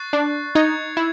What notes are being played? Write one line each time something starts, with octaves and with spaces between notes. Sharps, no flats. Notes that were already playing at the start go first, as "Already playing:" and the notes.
Already playing: C#6 F#6 A6 C7
D4
D#4 G#6 C#7 F7
E4